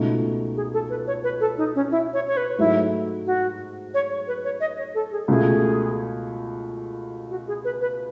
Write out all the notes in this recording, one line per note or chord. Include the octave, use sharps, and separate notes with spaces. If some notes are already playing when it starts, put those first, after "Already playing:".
Already playing: C#2 B2 A3 D#4
G#4
A4
B4
C#5
B4
A4
D#4
C#4
E4
C#5
C#5
B4
G#2 F#3 A3 D#4 E4
F#4
C#5
C#5
B4
C#5
D#5
C#5
A4
G#4
C#2 B2 A3 G#4
F#4
G#4
B4
B4